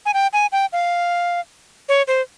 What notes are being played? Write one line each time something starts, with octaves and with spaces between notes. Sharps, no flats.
G#5
G5
G#5
G5
F5
C#5
C5